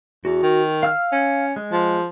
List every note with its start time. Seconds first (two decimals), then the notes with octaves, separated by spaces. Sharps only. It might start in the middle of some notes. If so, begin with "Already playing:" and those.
0.25 E2 F#4
0.43 D#3
0.83 F5 E6 F6
1.12 C#4
1.56 G#3
1.72 F3